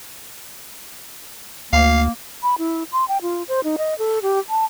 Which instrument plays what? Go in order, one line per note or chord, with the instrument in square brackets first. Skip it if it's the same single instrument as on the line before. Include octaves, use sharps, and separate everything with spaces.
[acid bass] D2 [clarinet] A#3 [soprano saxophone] F5
[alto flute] B5
E4
C6
G5
F4
C5
D#4
D#5
A4
G4
A5